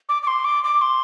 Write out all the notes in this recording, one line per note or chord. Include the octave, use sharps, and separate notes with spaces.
D6
D6
C6
D6
D6
C6